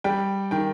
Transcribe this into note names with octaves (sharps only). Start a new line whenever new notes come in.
G3 G5
D#3 G5